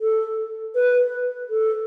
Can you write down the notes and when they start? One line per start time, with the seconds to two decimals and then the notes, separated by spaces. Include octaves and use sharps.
0.01 A4
0.76 B4
1.49 A4